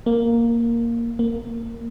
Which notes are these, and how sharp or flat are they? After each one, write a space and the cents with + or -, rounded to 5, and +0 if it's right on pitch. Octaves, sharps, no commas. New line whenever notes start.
A#3 +0
A#3 -15